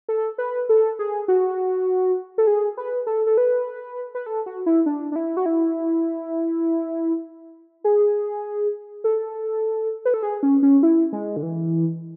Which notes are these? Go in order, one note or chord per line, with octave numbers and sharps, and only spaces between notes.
A4
B4
A4
G#4
F#4
A4
G#4
B4
A4
A4
B4
B4
A4
F#4
E4
D4
D4
E4
F#4
E4
G#4
A4
B4
A4
G#4
C#4
C#4
E4
G#3
D3
E3